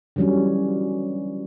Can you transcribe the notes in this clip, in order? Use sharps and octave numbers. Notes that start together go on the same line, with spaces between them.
D3 E3 F#3 G3 C#4